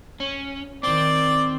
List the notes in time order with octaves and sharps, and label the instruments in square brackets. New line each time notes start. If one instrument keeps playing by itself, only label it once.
[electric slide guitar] C#4
[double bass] D#3 [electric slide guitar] C4 [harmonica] D5